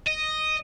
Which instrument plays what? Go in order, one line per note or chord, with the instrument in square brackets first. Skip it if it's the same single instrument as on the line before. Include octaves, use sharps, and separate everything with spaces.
[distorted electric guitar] D#5